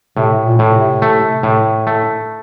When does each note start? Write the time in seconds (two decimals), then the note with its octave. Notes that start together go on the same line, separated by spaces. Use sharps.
0.17 A2 C3
0.45 A#2
0.59 A2
0.69 A#2
0.73 C3
1.02 A3
1.43 A2
1.87 A3